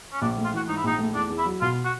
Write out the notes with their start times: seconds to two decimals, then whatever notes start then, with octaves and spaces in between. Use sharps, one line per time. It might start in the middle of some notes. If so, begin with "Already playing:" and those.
0.12 C#4
0.21 A#1 D4
0.37 A3
0.45 F4
0.53 E3 F#4
0.68 G#2 D#4
0.77 E4
0.84 A#1 D#4
0.99 A3
1.15 E2 D4
1.30 E2
1.38 E4
1.46 F#3
1.61 B2 F4
1.85 F#4